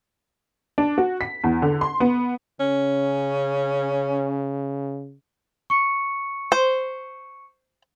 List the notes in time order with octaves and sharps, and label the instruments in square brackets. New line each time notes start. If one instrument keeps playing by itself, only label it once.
[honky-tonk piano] D4
F#4
B6
E2
D3
C6
B3
[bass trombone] C#3 [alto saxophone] C#4
[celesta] C#6 C#7
[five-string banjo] C5